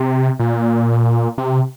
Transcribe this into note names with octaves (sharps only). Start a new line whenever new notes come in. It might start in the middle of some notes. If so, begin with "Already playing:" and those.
Already playing: C3
A#2
C3